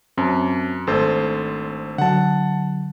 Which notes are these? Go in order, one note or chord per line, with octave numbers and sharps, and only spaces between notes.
F#2 C4 C#4 A5
G#1 A3 D4 A4 C5
D3 F#3 F#5 A5